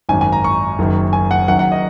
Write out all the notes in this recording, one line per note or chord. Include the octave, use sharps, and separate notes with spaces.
G#1 F#2 D#3 G#5
G#5
A#5
C#6
F#1 F#2 D#3
G#5
F#5
F#1 F#2 D#3 F#5
F#5
D#5